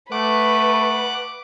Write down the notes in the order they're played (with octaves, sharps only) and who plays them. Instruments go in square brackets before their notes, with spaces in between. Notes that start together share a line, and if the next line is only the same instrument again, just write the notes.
[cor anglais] A3 [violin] B4 [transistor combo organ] F#5 D6